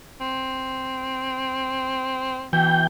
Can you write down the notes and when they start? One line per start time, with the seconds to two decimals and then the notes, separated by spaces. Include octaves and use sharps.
0.21 C4
2.53 B2 E3 G5 G6